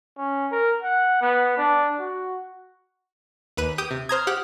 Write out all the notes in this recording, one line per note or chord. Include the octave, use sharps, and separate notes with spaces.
C#4
A#4
F#5
B3
D4
F#4
D#2 B4 D#7
G4 D#6 G6
C3
C5 A#5 D#6 F6 G#6
G4 F#5